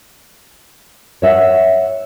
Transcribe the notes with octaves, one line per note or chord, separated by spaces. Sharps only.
C#5 E5 F#5